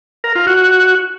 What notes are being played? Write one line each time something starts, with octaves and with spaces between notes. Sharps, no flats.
A#4
F4
F#4